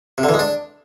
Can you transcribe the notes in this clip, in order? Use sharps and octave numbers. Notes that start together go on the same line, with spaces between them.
C3
D3
E3
G#3
D4